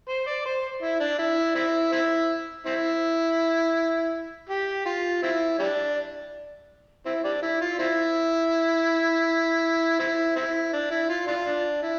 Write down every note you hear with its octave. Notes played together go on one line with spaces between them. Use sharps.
C5
D5
C5
E4
D4
E4
C4 E4
C4 E4
C4 E4
G4
F4
C4 E4
G3 D4
C4 E4
G3 D4
E4
F4
C4 E4
C4 E4
C4 E4
D4
E4
F4
D4 F4
D4
E4